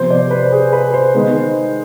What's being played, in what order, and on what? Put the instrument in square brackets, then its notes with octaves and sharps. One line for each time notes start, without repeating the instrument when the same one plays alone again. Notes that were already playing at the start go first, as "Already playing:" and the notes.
Already playing: [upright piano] C3 F3 B3 C5
D5
B4
G#4
B4
C5
D#3 G#3 B3